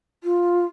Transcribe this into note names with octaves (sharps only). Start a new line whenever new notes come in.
F4